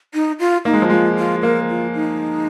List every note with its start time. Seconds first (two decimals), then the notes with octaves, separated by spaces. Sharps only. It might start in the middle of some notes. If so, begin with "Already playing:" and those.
0.14 D#4
0.40 F4
0.65 A#3 D#4
0.73 G#3
0.82 F3
0.90 G#3 F4
1.18 F4
1.42 A#3 A#4
1.69 F4
1.94 D#4